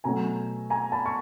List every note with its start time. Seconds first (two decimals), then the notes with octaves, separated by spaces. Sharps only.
0.04 B2 F#3 A3 G#5 A#5
0.70 G#5 A#5
0.92 A5 B5
1.06 C#6